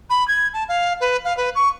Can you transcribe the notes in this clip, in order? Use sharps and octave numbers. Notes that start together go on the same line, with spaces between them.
B5
G#6
A5
F5
B4
F5
B4
C#6